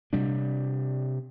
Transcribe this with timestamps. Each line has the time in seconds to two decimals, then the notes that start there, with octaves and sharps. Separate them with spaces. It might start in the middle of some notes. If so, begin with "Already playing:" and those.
0.13 C3 G3 D4